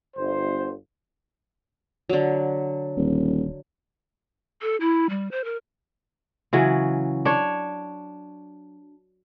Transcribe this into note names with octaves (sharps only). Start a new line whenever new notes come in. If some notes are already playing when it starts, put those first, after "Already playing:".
G1 C5
D3 F#3
D#1
A4
E4
G3
C5
A#4
C#3 E3 F#3
D4 C#5